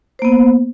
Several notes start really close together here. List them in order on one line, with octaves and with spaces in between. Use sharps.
C5 A#3 B3